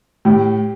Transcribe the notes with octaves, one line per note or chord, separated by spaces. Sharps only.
A2 G4